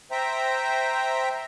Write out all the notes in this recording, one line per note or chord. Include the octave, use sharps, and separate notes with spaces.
C5 E5 G5 A#5